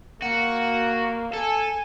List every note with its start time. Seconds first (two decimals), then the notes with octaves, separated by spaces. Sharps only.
0.22 A#3 F#4
1.34 A4 G#5